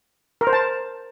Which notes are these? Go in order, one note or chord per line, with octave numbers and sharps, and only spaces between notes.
A#4
C5
A5